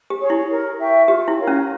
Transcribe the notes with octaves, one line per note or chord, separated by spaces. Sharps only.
G4
G#4 C#5
E4
A#4
E5 G5 C#6
F4 G4
E4
A#4 C#5 F5
C#4